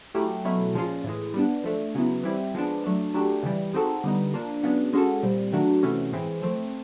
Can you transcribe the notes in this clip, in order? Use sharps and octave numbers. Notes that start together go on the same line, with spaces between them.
F#3 A3 C#4 E4 G4
B2 F#3 A3 C#4 E4
A#2 F3 G#3 C#4 F4
A2 E3 G#3
G3 B3 D4
F3 A3 D4
C#3 F#3 B3 E4
E3 G3 C4 E4 G4
F3 G#3 B3 D4
F#3 A3 D4
F#3 A3 D4 G4
C#3 E3 G3
G#3 C4 D#4 F#4 A4
D3 G3 B3 D#4
F3 A#3 D4
C#3 F#3 B3 D4
G#3 C#4 F#4 A4
A#2 G3 C4
D#3 F#3 A3 D4 F#4
C3 E3 A3 C#4 F#4
A2 E3 G#3 C4
F3 A3 C4